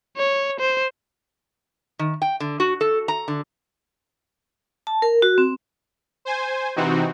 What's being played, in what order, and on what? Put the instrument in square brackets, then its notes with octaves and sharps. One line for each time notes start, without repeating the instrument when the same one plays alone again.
[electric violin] C#5
C5
[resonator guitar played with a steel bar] D#3
G5
D3
F#4
A4
A#5
D3
[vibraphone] A5
A#4
F#4
C4
[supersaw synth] C5 G#5
C3 E3 C4 D#4 F#4